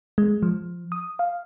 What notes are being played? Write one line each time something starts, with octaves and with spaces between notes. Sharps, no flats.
G#3
F3
D#6
F5